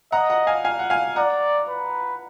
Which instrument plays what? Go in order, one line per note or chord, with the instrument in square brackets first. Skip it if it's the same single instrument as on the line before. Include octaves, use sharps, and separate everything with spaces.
[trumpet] D#5 [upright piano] F#5 A#5
[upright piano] F#5 A#5
F5 G#5
F5 G#5
F#5
F5 G#5
[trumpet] D5 [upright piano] F#5 A#5
[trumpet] B4